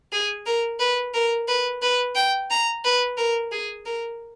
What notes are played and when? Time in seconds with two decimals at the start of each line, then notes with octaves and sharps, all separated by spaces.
0.13 G#4
0.46 A#4
0.80 B4
1.14 A#4
1.48 B4
1.82 B4
2.15 G5
2.50 A#5
2.84 B4
3.17 A#4
3.52 G#4
3.86 A#4